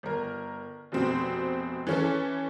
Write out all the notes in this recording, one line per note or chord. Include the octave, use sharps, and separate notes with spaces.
G1 A#4
F1 B2 C4
E3 C#4 A4